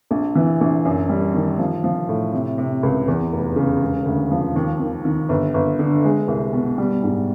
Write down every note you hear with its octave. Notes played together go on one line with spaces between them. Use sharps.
A#1
E3
A#1
F#2
G3
D#3
F3
F3
A2
C3
C3
C#2
E2
F1
C#3
E1
D2
F3
D#2
D#3
D#3
G1
G1
D3
G#3
C2
B2
G3
G#2